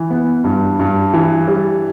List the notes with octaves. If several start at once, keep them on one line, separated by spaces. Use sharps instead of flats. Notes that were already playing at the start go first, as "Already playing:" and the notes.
Already playing: E3
B3
G2
G2
E3
G3